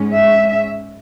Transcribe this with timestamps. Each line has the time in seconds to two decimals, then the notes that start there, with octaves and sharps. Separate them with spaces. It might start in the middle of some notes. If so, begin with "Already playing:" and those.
Already playing: G#2 G#3 C#4
0.16 E5